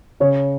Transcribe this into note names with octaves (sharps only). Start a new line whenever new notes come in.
C#3 C#5